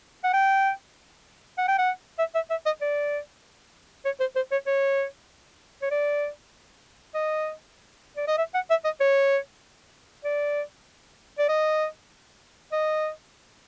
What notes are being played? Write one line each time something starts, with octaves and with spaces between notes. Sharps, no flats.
F#5
G5
F#5
G5
F#5
E5
E5
E5
D#5
D5
C#5
C5
C5
C#5
C#5
C#5
D5
D#5
D5
D#5
E5
F#5
E5
D#5
C#5
D5
D5
D#5
D#5